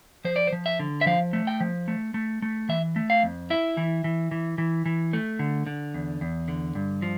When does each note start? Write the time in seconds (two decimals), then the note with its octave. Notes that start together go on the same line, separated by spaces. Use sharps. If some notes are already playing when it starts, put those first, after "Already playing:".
0.25 F3 C5
0.36 D5
0.47 C5
0.52 F3
0.66 E5
0.79 D3
1.01 E5
1.06 F3 F5
1.33 A3
1.47 G5
1.60 F3
1.88 A3
2.14 A3
2.42 A3
2.69 E3 E5
2.96 A3
3.10 F5
3.23 F2
3.50 E4 E5
3.77 E3
4.04 E3
4.31 E3
4.58 E3
4.86 E3
5.13 A3
5.39 D3
5.67 D3
5.94 E2
6.21 E2
6.48 D3
6.75 G2
7.02 F3